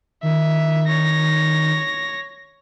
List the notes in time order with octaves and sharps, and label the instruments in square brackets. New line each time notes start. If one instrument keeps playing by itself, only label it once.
[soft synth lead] D#3 [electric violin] E5
[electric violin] C#5 A#6